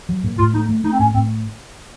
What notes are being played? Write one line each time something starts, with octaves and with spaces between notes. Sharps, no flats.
F#3
A#2
A2 F4
A3 D#4
A3
A3 D#4
C4
A2 C#4
A2 C4